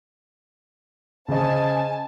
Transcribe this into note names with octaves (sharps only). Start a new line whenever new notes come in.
C#3 C5 D#5 G#5 A5